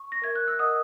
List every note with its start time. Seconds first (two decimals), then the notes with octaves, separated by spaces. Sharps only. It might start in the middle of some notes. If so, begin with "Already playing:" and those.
Already playing: C#6
0.12 A#6
0.22 A#4 E5 G#6
0.35 F#6
0.48 E6
0.59 A#4 D#5 F#5 D#6